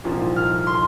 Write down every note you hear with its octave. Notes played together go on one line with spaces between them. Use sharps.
C2 A#2 F3 C4 D#4
F6
C6